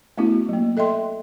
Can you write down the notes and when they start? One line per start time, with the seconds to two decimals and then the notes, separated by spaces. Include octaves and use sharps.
0.18 A3 B3 C#4 E4 F#4
0.49 F#3 A#3
0.77 A4 D#5 E5 G5 C6